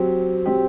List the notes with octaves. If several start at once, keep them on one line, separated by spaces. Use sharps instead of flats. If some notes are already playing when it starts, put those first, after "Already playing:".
Already playing: F#3 C4 G4
F#3 C4 G4